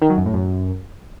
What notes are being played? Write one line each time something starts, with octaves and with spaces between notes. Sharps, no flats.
D#3
F#3
F#2
A2
F#2